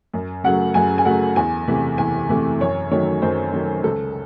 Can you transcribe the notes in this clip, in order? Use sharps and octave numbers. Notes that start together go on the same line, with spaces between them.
F#2
C#3 F#3 A3 F#5
F#2 G#5
G#5
C#3 F#3 A3 F#5
E2 G#5
C3 E3 A3
E2 G#5
C3 E3 A3
F#2 C#5
D#3 F#3 A3 C#5
F#2 C5
D#3 F#3 A3
C#2 A4